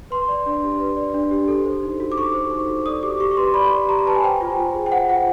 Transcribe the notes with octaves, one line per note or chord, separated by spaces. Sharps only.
B4 C6
D5
D4
G4
B4
D5
D4
G4
A4
C5
D#4
F#4
D6
A4 C#6
C5
D#4
F#4
D5 D#6
G4 D6
G4 C#6
C#6
B4 C6
D5 B5
G4
G4 A#5
A#5
B4 A5
G#5
C5 G5
F4
F4
G#4
G5
C5 F#5
F4 F#5